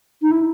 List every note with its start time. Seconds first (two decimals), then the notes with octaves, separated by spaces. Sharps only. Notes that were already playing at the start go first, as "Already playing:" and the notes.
0.22 D#4
0.31 E4